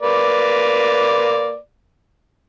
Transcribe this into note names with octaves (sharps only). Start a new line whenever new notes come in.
A#3 B4 D5